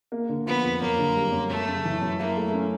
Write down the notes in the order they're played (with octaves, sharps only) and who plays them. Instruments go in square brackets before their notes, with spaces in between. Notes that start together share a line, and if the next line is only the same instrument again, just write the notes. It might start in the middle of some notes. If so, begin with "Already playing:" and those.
[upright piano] A#3
D3
[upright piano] F3 [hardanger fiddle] B3
[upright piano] F2
[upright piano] F#2 [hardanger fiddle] A#3
[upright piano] D3
G3
F#2
[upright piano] F#2 [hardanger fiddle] A3
[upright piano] C#3
E3
F#2
[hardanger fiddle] A#3 [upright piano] E4
[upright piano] A3
C#4